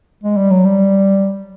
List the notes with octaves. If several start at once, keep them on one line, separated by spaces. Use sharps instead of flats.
G#3
G3
F#3
G3